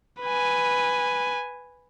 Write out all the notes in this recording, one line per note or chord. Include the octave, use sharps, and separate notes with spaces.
B4 G#5